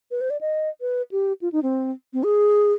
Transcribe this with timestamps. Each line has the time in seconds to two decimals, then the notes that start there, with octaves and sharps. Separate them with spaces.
0.11 B4
0.21 C5
0.30 D5
0.41 D#5
0.81 B4
1.12 G4
1.42 F4
1.52 D#4
1.63 C4
2.13 C4
2.24 G#4